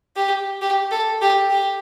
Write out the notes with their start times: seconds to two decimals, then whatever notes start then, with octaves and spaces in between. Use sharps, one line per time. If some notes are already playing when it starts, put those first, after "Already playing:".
0.16 G4
0.61 G4
0.91 A4
1.21 G4
1.51 G4